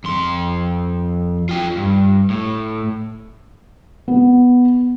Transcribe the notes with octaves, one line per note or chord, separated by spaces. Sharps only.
F2 C6
F4 G5
G2
A2
B3